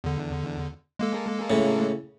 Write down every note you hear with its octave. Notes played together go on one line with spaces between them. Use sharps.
E2 D3
G#3 A#3 A4
A2 C#3